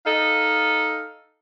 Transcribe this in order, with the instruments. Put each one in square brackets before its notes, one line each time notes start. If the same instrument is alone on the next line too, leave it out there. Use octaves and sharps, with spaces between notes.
[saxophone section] D#4 A4 D#5 F5